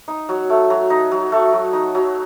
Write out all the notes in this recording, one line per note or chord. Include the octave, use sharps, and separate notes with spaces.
D#4
F#3
A3
F#3
D#4
F#3
A3
F#3
D#4
F#3